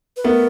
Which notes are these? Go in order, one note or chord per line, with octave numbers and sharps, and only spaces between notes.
B4
A3 B3 A#4